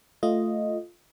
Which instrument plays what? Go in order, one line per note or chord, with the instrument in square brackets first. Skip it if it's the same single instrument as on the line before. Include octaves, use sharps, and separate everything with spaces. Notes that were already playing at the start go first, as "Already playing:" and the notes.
[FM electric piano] A3 F4 D#5